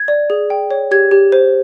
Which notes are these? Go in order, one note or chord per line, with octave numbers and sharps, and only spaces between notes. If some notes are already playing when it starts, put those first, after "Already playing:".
Already playing: G#6
D5
G#4
G5
C#5
G4 G#6
G4
C5